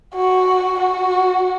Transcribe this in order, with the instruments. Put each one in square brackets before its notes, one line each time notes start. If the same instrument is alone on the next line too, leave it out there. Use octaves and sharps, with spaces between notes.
[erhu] F#4
F#4